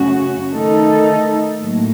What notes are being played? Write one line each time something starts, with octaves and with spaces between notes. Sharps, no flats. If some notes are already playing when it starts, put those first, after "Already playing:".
Already playing: F#2 C#3 A3 C#4 F#4
D#3 A3 D#4 A4
A2 F#3 A#3